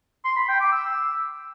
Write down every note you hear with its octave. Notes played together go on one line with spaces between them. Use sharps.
C6
B5
G5
D6
E6